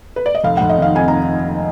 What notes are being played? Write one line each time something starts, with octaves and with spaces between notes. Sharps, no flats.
B4
D5
D#5
F1 F5
F1 F#5
D#5
D#3 F5
F2 G#5
A#5